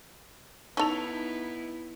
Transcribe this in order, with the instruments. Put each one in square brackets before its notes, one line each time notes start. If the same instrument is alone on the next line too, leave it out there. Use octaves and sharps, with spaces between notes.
[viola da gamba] B3 E4 [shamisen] C#4 A4 [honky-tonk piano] D#4 F7